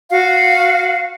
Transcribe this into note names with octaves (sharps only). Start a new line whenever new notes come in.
F#4 F5